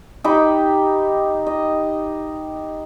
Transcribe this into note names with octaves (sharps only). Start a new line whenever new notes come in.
D#4 G4 G5 B5
D#5